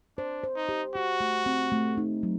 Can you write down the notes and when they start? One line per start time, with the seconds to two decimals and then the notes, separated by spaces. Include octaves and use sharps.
0.18 D4 C5
0.43 C5
0.56 D#4
0.69 G4
0.95 F#4 G4
1.20 A3
1.46 C4
1.72 A3
1.98 D#4
2.23 F#3